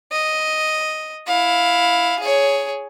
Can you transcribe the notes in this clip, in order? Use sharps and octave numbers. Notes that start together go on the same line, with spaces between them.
D#5
E4 F5
G#4 C#5